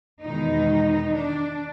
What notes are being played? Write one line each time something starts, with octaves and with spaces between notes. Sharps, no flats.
E2 B2 D#3 G#3 D#4
D4